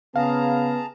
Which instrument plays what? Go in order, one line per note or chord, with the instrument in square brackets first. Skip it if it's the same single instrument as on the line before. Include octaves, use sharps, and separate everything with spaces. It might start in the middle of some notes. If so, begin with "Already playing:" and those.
[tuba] C#3 [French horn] B3 [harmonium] G#4 A5 A#5 [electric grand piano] F5